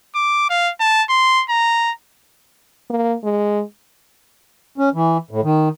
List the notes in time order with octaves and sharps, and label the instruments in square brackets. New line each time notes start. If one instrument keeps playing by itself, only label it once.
[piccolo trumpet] D6
F5
A5
C6
A#5
[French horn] A#3
G#3
[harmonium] C#4
E3
A2
D#3